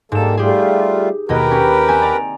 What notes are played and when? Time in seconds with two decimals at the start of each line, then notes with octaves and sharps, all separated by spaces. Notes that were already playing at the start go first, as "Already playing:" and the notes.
0.12 G#2 G3 A#3 A4 E7
0.37 G3 A3 F4 G4 G#4
1.29 D#2 B2 G4 A#4 B4 D#5
1.51 C#4
1.88 C4 G#5
2.02 D5 A#5